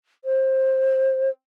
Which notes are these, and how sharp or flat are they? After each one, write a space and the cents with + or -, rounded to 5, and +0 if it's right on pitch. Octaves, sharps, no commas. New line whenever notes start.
C5 +20